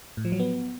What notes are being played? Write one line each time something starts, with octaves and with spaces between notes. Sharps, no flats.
A2
F3
F#3
B3